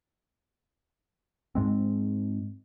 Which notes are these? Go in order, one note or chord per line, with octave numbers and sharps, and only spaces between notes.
G#2 G#3 C4